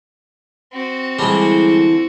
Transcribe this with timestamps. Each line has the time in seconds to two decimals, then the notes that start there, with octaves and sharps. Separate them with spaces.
0.72 C4 F#4
1.19 D3 E3 G3 G#3